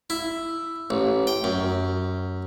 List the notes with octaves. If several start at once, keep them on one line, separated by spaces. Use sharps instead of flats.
E4
A1
G5
F#2